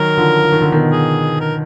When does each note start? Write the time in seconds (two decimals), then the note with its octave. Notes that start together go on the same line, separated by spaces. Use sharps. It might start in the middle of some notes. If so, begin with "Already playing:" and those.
Already playing: D#3 F#3 A#4
0.17 D3 F3
0.42 F3
0.52 D#3
0.62 D3
0.72 B2 D#3
0.92 G#4
1.40 A#4